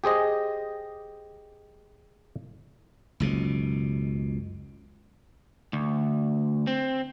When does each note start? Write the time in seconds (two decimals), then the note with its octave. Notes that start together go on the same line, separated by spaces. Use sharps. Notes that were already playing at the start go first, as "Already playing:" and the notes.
0.04 G4 G#4 C5 D#5
3.20 F#1 C#2 B2
5.73 D2
6.67 C4